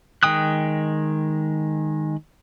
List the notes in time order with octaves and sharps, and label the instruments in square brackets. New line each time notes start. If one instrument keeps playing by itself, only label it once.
[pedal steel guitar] D#3 G#3 G5 D#6 F#6